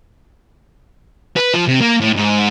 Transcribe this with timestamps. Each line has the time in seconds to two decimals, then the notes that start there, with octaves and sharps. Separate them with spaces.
1.37 B4
1.54 F3
1.68 C3
1.81 A#3
2.00 A2
2.16 G#2